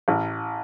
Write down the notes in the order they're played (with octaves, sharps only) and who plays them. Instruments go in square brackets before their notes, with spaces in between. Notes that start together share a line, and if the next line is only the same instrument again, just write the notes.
[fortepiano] A1